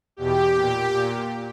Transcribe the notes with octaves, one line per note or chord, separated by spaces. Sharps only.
E2 B2 G4
A#2
A#2